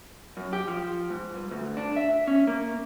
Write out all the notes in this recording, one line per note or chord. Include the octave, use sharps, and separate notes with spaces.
F#2
G4
F3
G#2
G2
D2
D4
E5
C#4
A#3